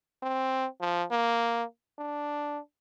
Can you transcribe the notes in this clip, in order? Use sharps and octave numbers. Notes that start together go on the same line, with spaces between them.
C4
F3
A#3
D4